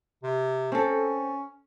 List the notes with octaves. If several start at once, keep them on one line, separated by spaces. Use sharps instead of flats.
C3
C4 C#4 A4